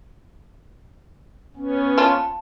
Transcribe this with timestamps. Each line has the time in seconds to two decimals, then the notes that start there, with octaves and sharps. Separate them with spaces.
1.56 B3 C#4
1.98 F3 F4 A5